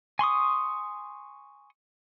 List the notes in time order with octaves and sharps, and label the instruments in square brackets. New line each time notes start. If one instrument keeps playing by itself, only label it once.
[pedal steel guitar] G#5 C6 C#6 D#6